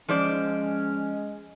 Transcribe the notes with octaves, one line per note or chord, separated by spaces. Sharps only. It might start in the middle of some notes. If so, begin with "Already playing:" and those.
F3 G#3 C#4 C5 D5